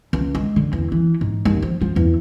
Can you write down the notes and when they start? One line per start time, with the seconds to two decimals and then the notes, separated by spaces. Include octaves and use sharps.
0.13 C#2
0.35 G#3
0.56 D3
0.73 E2
0.92 E3
1.21 G#2
1.45 D#2
1.63 F3
1.81 F3
1.96 E2